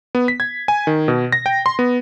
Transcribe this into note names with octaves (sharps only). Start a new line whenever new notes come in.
B3
B6
G#6
G#5
D#3
B2
A#6
G5
C6
B3